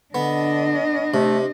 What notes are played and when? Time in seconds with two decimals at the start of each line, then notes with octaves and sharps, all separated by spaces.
0.15 D3 B3 D4 D#5
1.14 C3 A3